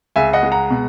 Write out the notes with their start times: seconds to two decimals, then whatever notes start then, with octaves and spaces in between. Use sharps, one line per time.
0.16 C#2 E5 G#5
0.33 D#5 F#5
0.43 G#3
0.52 F#5 A#5
0.70 B2